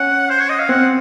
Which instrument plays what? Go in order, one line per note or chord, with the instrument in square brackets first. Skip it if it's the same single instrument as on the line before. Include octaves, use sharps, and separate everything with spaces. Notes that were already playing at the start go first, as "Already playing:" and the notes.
Already playing: [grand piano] C#4 [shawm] F#5
[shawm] C5
C#5
D#5
F5
[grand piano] C4 [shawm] F#5